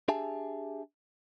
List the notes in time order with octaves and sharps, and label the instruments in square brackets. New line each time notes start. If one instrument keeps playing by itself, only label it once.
[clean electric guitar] D4 G4 G#4 E5 G#5 A5